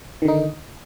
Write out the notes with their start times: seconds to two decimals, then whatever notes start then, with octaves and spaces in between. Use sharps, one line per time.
0.22 D#3
0.25 D3
0.28 D#4